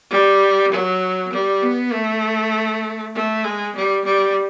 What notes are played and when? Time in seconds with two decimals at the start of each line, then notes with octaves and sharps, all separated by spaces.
0.11 G3
0.72 F#3
1.32 G3
1.62 B3
1.93 A3
3.15 A3
3.44 G#3
3.75 G3
4.05 G3